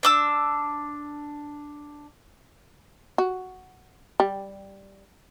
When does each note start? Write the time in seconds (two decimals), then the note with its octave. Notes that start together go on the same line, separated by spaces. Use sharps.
0.03 D4 D6 E6
3.18 F#4
4.20 G3